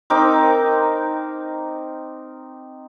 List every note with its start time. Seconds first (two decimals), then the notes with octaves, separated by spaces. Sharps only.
0.10 C4 D#4 A#4 D6